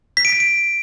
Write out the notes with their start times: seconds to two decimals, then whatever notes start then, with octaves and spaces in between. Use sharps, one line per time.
0.17 B6
0.25 D7
0.32 B6
0.40 D7